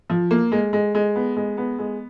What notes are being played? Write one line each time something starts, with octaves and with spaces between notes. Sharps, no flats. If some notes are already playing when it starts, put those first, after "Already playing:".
F3
A#3
G#3
G#3
G#3
B3
G#3
B3
G#3